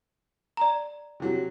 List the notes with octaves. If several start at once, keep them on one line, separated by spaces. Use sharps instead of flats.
D5 A#5
C3 F#3